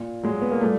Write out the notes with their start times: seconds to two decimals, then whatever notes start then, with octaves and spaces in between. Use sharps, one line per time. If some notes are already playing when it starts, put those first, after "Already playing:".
Already playing: A#2
0.23 A#2 F#3 G#3
0.42 B3
0.51 A#3
0.61 A#2 G3 A3